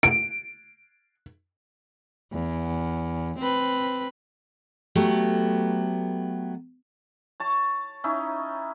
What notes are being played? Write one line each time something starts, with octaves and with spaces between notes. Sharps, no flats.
D7
E2
C4 B4
F#3 A3 B3 G4
C#5 A5
C#4 D#4 E4